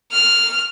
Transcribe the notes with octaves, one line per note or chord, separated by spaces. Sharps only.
F6